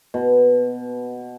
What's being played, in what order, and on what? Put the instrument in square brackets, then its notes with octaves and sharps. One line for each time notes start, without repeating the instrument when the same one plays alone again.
[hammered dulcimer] B2